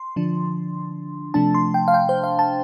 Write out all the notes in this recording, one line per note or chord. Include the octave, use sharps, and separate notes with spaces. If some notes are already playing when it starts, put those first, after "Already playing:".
Already playing: C6
D3 F3 D4
C3 F3 A3 D4 A5
C6
G5
F5
G5
C5
F5
A5